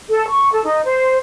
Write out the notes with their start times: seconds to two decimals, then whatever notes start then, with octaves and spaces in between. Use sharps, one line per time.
0.08 A4
0.28 C#6
0.52 A4
0.66 D#4
0.84 C5